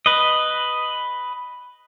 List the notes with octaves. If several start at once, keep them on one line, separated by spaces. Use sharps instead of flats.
B4 D#5